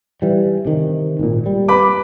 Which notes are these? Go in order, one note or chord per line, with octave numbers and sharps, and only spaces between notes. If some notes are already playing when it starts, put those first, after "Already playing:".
E3 G3
C3 D#3
G#1 A#2
G3
B4 B5 D6